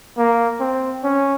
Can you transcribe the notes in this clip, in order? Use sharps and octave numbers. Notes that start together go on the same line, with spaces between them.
A#3
C4
C#4